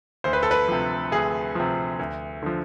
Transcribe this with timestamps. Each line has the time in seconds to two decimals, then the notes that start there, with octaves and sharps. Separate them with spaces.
0.24 D2 C5
0.33 B4
0.43 A4
0.51 B4
0.68 C3 F3
1.11 D2 G#4
1.55 C3 F3
1.99 D2
2.43 D3 F3